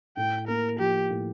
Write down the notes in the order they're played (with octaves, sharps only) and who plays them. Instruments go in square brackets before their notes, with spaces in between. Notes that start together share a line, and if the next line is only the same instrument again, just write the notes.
[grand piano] A2 [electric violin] G5
[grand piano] A#3 [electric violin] A#4
[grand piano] F3 [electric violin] G4
[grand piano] A2